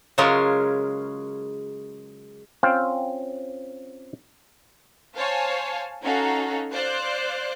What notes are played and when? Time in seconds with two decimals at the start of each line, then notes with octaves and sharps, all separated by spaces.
0.18 C#3 F#3 G#3 C#4 F4 A#4
2.63 C4 C#4 F4 F5 G5
5.16 C5 C#5 F5 G#5 A5
6.03 C#4 D#4 F#4 A4 F5 A#5
6.72 C5 D5 F5 F#6